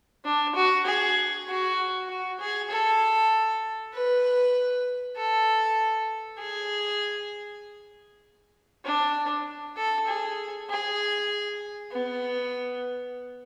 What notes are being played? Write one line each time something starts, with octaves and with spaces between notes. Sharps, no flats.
D4
F#4
G#4
F#4
F#4
G#4
A4
B4
A4
G#4
D4
A4
G#4
G#4
B3